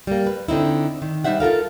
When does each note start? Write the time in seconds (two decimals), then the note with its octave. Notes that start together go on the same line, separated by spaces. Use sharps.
0.07 G3 A#3
0.26 B4
0.48 D3 C4 D#4 E4
1.02 D#3
1.24 G3 D#4 C5 E5 F#5
1.40 F4 A4 A#4 F5